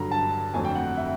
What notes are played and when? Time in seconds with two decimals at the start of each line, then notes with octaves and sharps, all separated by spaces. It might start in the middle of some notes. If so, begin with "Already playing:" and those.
Already playing: G2 D3 F#3 A#5
0.12 A5
0.54 F2 D3 F#3 A3 C4 G#5
0.65 G5
0.75 F#5
0.86 F#5
0.97 E5